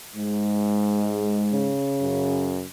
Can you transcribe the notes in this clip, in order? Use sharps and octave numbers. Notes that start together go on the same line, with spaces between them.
G#2 G#3
C#3
F#2